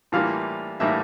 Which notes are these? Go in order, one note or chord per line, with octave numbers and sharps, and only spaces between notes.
A2 E3 G3 A#3 F4 F5
A2 E3 G3 A#3 E4 E5